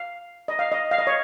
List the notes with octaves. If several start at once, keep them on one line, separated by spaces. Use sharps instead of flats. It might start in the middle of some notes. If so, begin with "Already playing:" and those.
Already playing: F5
D#5
F5
D#5
F5
D#5
C#5